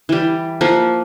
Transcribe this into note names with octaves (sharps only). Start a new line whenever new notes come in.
E3 G3
F3 A#3 F#5